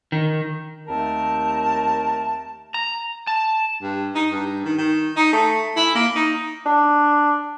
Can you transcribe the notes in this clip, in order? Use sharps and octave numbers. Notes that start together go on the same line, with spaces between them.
D#3
D#2 A3 C4 A#4 A5
A#5
A5
G2
D#4
G2
D#3
D#3
D#4
A3
E4
A#3
D#4
D4